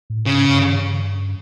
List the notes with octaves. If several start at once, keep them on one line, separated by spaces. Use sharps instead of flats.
A2
G#2 C#3
G2